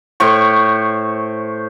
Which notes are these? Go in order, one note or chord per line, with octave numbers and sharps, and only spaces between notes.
A2 C5 C#6